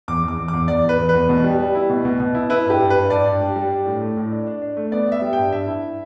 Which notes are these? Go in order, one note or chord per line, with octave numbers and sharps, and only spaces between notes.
E2 D6
E2 D6
E2
E2 D6
E2 D5
E2
B4
E2
E2 B4
B2
G3
G3
E4
B2
B2
B2
E4
E4 B4
G2 G4
G2
B4
G2
G2 D5
G2
G3
G3
D4
A2
A3
A2
D4
D4
D4
A3
B3 D5
B3
E5
G3
G2 G5
G2 E5
E4